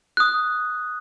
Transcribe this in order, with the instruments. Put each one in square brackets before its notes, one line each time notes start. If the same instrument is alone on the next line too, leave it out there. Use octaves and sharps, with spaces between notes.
[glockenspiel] D#6 F#6